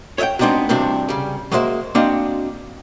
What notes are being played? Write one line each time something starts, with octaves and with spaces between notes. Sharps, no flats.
C#5 D#5 E5 F#5 G5
G#3 B3 C4 D4 D#4 F#4
G2 C3 E3 C4 D4 F#4
C#3 G3
F#3 G#3 A#3 C5 E5
A#3 C4 D4 F#4 D#5 F5